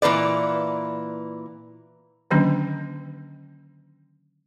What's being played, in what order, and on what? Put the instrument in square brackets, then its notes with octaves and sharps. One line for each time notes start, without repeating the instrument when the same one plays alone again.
[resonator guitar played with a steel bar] A#2 E3 A#3 B4 D5
[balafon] D3 D#3 F#3 A#3 C#4 D4